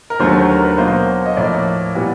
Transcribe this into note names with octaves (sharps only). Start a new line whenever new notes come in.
A#4
D#2 D3 F#3 A3 C5
A#4
B4
B2 F#3 A#3 C5
D#5
A2 F3 A#3 D5
A#2 G3 B3 E4